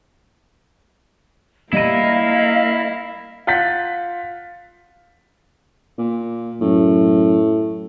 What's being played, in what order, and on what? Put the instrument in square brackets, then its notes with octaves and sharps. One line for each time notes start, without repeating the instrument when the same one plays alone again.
[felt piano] G3 D#7 [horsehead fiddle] A#3 F5 [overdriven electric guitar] E4 [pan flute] D#5
[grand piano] F4 F#5 G6 A6 B6
[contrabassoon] A#2
[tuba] F#2 [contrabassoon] A2